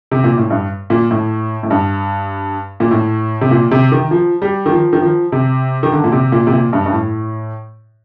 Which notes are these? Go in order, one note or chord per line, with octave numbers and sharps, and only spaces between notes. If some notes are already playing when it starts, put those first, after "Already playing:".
C3
A#2
A2
G2
A#2
A2
A2
G2
A#2
A2
C3
A#2
C3
D#3
F3
G3
D#3
F3
D#3
F3
C3
D#3
D3
A#2
C3
A#2
C3
A#2
G2
G2
A2